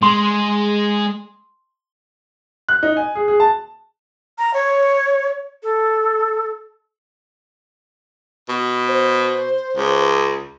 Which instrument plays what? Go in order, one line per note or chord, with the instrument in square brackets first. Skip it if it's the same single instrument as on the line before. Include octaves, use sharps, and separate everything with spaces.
[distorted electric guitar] G#3 [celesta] C6
[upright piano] F#6
D#4
G#5
G#4
G#4
A5
[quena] A#5
C#5
A4
[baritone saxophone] B2
[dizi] C5
[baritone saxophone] C#2